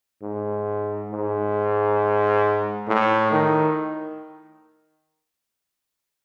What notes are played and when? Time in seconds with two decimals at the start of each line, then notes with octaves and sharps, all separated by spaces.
0.22 G#2
1.11 G#2
2.88 A2
3.31 D#3